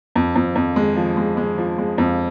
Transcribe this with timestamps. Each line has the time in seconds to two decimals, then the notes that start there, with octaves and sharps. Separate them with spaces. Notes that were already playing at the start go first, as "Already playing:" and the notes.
0.16 F2
0.36 F2
0.55 F2
0.76 G#3
0.96 F3
1.17 G#3
1.37 G#3
1.58 F3
1.78 G#3
1.98 F2